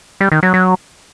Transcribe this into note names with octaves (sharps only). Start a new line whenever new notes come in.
G3
D#3
F#3
F#3